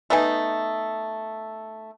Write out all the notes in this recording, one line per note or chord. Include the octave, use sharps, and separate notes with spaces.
A3 B3 D#4 G#5